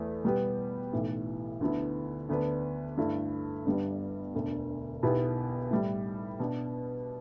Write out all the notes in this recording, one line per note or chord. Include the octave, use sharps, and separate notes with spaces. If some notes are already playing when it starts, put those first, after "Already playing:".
Already playing: E2 E3 A3
B2 G3 B3 G4 B4
B1 A2 E3
D2 D3 B3 E4
D2 D3 B3 D4 B4
G2 D3 A3 E4
G1 G2 G3 B3
E1 D2 D3
B1 B2 B3 E4 G4
A2 G3 E4
B2 B3 D4